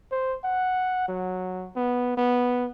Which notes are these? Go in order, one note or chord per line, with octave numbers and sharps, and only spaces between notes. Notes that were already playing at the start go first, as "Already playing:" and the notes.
C5
F#5
F#3
B3
B3